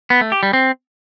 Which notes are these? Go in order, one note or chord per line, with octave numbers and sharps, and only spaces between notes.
B3
A3
G4
G3
C4